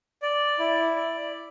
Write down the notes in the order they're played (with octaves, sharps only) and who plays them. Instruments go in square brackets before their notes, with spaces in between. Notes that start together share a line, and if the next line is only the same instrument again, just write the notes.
[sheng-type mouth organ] D5
E4
D5